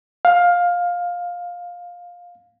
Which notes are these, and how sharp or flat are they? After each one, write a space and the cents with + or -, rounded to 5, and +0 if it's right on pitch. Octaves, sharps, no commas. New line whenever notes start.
F5 +15